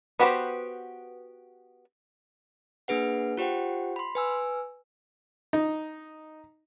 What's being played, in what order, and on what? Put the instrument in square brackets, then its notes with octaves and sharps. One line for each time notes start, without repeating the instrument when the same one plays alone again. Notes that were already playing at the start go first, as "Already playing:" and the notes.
[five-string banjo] B3 F#4 G4 B4 C5
[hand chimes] A#3 D4 G#4 B4 F#5
F4 G4 C5 F#5 G5
B5 C6
B4 G#5 E6
[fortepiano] D#4